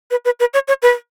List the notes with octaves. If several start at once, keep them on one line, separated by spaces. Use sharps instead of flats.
B4
B4
B4
C#5
C#5
B4